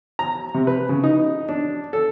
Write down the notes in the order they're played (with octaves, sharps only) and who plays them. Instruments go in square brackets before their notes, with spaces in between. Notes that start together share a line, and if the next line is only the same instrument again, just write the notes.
[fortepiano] A#5
C3
B4
C#3
D#4
D4
A4